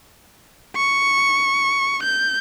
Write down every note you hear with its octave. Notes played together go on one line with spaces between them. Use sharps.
C#6
G6